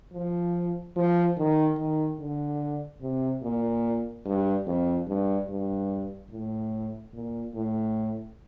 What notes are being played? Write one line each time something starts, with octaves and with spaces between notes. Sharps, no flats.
F3
F3
D#3
D#3
D3
C3
A#2
G2
F2
G2
G2
A2
A#2
A2